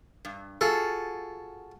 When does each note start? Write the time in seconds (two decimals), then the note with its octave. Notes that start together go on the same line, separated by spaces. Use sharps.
0.25 G2
0.61 F4 F#4 G#4 A4